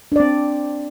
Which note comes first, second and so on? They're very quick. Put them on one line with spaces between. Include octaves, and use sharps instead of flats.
D4 D5 C4